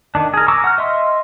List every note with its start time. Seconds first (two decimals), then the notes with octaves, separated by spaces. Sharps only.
0.15 D#3 D4
0.34 G#4 A#4
0.48 G#5 A#5 C#6 D6 E6
0.64 F#5 F6
0.78 D#5 E5 C6